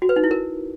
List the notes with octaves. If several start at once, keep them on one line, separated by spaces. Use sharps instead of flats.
F#4
B4
D#4
E4
A#4